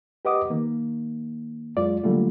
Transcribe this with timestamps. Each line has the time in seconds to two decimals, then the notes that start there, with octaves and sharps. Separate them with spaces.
0.25 G4 B4 D#5 F#5 D6 D#6
0.50 D#3 A#3
1.77 F#2 G#3 F4 D5
2.04 D3 F#3 G3 A3 A#3 F4